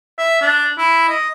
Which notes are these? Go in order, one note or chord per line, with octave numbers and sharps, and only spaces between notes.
E5
D4
E4
D#5